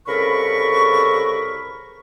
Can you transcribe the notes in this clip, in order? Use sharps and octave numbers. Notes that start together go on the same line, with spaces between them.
C2 C#3 A4 A#4 B5 C#6